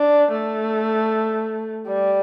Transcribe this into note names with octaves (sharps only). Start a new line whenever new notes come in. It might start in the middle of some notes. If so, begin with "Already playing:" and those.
Already playing: D4
A3
G3